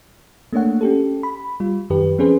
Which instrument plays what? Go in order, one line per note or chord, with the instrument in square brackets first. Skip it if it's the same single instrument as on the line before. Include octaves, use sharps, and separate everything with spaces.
[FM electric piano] A3 A#3 D4 C#5 F#5
C#4 G4 A4
B5
G3 F4
F#2 D#3 G4 B4
F3 C4 C#4 G#4 B4 C5